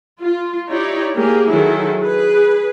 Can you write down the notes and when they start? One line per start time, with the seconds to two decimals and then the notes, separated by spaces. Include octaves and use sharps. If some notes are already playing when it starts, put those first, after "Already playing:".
0.19 F4
0.71 D#4 E4 G4 C#5 D5
1.17 A#3 G4 G#4
1.52 D#3 F#3 E4 G#4 A4
2.00 G#4 B4